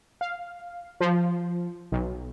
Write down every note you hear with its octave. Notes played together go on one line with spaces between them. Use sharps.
F5
F3
B1